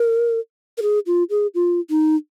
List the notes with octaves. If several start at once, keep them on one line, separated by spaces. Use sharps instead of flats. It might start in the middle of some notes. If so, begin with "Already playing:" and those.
Already playing: A#4
A#4
G#4
F4
G#4
F4
D#4